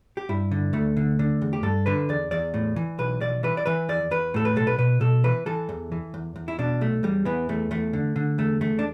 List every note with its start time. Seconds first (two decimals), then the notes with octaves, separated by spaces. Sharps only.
0.17 G4
0.29 G2 E4
0.52 D3
0.73 D2 A3
0.97 D3
1.19 D3
1.42 E2
1.53 G4
1.63 G2 A4
1.86 D3 B4
2.09 E2 D5
2.31 E2 D5
2.54 A2
2.76 E3
2.99 B1 B4
3.21 B1 D5
3.43 E3 B4
3.57 D5
3.66 E3 B4
3.89 E2 D5
4.11 E2 B4
4.34 A2 A4
4.45 B4
4.56 B1 A4
4.67 B4
4.78 B2 B4
5.01 B2 A4
5.24 E3 B4
5.46 E3 A4
5.69 E2
5.92 E3
6.14 E2
6.36 E2
6.48 E4
6.59 B2 D4
6.81 B1 A3
7.03 E2 G3
7.25 E3 B3
7.49 E2 A3
7.71 E2 A3
7.93 D3
8.16 D3
8.38 E2 A3
8.61 E2 A3
8.79 D4